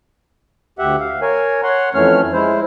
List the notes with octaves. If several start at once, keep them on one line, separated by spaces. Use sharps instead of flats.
D2 G4 E5 F#5
F5
A#4 C#5 G#5
C#5 F#5 C6
F2 E3 A3 C#4 C#5 F6
G#3 E4 C5